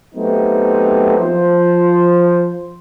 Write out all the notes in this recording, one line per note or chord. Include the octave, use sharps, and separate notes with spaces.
F#3 A3 B3 C4 D#4 G4
F3 C5